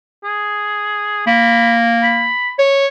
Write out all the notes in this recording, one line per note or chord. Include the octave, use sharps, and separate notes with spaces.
G#4
A#3 B5
B5
C#5